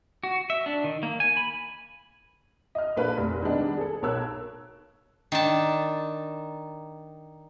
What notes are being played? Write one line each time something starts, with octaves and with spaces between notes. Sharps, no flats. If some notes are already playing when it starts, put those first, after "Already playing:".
F#4
E5
D4
D#3
A#3
G#5
B5
D#5 F6
A#1 A#3 A4 B4 B5
F1
D#3 G3 G#3 B3 D4 D#4
G#4 A4
B1 A#4 C#5 A5 E6 F#6
D#3 D4 A5